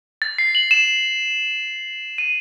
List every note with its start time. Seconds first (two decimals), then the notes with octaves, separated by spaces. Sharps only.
0.22 A6
0.38 C7
0.55 F#7
0.71 E7
2.18 D#7